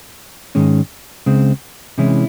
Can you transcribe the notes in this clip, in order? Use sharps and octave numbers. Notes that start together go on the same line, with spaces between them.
G#2 D#3 G#3 C#4
C#2 C#3 G#3 C4
C3 E3 G#3 C#4 E4